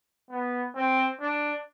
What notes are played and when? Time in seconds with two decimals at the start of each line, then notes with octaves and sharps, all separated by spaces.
0.30 B3
0.75 C4
1.21 D4